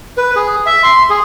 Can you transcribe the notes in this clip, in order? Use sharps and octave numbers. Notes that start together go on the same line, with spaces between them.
B4
G#4
E5
C6
G#4